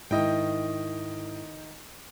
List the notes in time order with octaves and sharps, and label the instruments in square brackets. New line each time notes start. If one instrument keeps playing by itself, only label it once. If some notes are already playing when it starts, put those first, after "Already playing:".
[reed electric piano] G#2 E4 [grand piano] D#3 D#5 G5